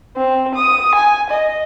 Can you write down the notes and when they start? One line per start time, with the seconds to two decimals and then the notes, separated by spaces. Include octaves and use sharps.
0.17 C4
0.55 D#6
0.95 G#5
1.30 D#5